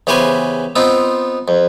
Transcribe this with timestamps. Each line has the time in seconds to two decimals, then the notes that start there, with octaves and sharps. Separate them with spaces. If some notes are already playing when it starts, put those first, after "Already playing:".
0.07 E2 C#3 G4 B4 C5 G#5
0.76 B3 C4 D#4 F4
1.48 F2